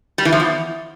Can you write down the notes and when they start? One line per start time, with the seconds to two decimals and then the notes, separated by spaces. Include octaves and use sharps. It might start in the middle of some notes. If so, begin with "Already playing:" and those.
0.18 G3
0.25 E3
0.33 F3
0.40 E2